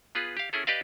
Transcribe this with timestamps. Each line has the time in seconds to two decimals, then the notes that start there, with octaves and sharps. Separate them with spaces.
0.15 B3 F4 G#4 B4
0.37 G4 F5
0.53 C#4 E4 G#4 A4
0.67 G4 B4 D5 D#5 F5